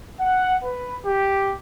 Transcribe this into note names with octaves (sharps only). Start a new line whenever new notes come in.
F#5
B4
G4